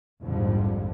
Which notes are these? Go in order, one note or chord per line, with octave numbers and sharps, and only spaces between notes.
A#1 F2 G#2 D3 F3 G3